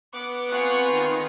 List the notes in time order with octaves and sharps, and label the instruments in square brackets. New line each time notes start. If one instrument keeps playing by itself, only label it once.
[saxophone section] B3 [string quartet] D6 F#6
[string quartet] C4 F4 G#5 [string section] F#5 C#6
[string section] D#3